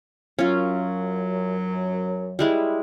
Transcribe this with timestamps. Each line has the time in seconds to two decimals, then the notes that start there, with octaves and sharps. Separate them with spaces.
0.39 F#2 F#3 C#4 F4
2.39 G3 G#3 E4